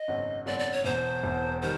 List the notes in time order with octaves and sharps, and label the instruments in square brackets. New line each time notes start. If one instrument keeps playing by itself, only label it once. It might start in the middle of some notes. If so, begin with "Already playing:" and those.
Already playing: [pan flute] D#5
[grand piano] G#1 F#2 C#3 F#3 B3
[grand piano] G#1 F#2 C#3 F#3 B3 [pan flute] D5
[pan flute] D5
C#5
[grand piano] E1 E2 B2 [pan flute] C5
[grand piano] E1 E2 B2
[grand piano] D#3 G3 [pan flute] C5